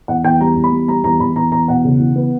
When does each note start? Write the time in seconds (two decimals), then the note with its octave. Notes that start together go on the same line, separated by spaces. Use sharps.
0.08 E2 F#5
0.24 E2 G5
0.40 G3 A#5
0.57 E2
0.64 B5
0.72 G3
0.88 G3 A#5
1.04 E2 A#5
1.20 E2 B5
1.36 E2 A#5
1.52 E2 A#5
1.68 B2 F#5
1.84 C#3
2.00 E3
2.16 B3